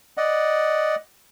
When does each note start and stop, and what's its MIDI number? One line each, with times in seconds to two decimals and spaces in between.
0.17 0.95 74
0.17 0.95 75
0.17 0.95 78